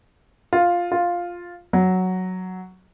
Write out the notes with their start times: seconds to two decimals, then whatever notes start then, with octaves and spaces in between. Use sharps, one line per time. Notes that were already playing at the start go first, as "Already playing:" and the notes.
0.53 F4
0.92 F4
1.73 F#3